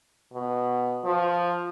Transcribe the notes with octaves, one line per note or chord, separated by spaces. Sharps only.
B2
F3